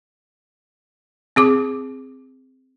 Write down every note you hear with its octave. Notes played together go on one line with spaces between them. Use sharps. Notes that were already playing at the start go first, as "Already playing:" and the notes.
C4 G#4 D6